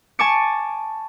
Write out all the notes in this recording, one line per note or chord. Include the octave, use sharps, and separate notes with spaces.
G#5 A5 C#6 D6 C#7